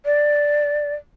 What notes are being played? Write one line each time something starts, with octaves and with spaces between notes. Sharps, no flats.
D5